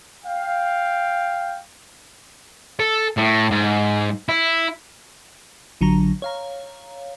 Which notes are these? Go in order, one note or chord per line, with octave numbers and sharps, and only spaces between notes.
F5 G5
A4
A2
G#2
E4
A#1 D3 F#3 A#5
C#5 F5 A#5